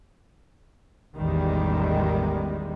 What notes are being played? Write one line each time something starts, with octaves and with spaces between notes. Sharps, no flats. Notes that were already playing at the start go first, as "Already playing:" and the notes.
A1 E2 D#3 G3 G#3